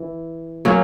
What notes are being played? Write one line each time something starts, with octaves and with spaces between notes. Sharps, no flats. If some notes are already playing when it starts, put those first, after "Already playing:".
Already playing: E3
F#3 A#3 C#4